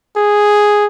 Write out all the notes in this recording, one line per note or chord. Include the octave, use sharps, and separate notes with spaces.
G#4